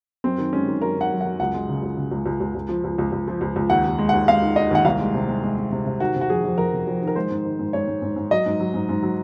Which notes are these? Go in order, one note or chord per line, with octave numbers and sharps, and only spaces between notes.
F#2 C4
D#3
G#3 C#4
D#3
F#2 A#4
D#3 F#5
F#2
F#5
F#2
C#2 F#5
G#3
C#3
C#2
C#3
C#2
C#2
C#2
C#2
F3
C#2
C#2
C#2
F3
C#2
C#2
D#2 F#5
D#2
G#3
D#2 F#5
G#3 F5
D#3
D#3 D#5
D#2 F#5
C2 F5
G#3
C3
G#3
G#3
G#3
C3
C3
D#3 F#4
C3
F#4
F2 G#4
F2
F2 A#4
C3
F2
D#3
A#4
G#3 C5
G#2
D#3
G#2
G#2 C#5
G#2
G#2
G#2
F#3 D#5
G#2
F#3
G#2
G#2
F#3